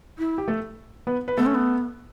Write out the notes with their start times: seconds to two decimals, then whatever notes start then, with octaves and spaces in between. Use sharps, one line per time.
0.19 E4
0.38 G4
0.48 A3 A4
1.07 B3 B4
1.28 B4
1.37 A3 B3 A4
1.46 C#4
1.54 B3